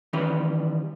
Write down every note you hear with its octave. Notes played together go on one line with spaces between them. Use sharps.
D#3 E3 G3 C#4 B4